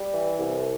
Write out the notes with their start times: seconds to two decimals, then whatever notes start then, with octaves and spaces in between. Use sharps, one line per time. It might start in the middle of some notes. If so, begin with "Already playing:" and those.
Already playing: G3
0.13 E3
0.39 C2